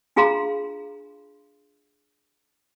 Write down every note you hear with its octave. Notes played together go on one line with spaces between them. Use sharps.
D4 F4 G#4 F5 A#5 C6